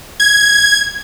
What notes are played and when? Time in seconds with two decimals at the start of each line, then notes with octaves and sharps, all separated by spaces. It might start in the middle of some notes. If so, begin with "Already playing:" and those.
0.20 G#6